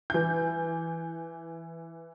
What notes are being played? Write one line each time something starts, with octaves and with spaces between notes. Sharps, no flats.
E3 G6